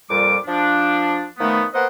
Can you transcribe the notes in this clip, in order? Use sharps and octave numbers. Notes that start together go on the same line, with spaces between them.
F2 A#2 G3 D6
F3 D4
D#3 F3 A3 B3
A#3 B3 C5 D#5 F#5